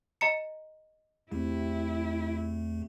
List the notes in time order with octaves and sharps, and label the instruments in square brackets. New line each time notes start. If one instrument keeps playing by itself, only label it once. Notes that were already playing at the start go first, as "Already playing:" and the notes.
[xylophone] D#5 A#5 C#7
[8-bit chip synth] E2 A3 [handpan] G3 C4 [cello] E4